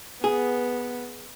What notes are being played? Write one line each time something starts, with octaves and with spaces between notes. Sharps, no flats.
B3 G#4